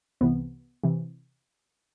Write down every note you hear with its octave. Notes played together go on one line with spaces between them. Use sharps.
C2 C3 E3 B3
C3 E3